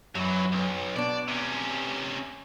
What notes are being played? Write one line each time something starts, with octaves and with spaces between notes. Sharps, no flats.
F#2 E3 F#3
B1
B2 D4 D5
C3 C#4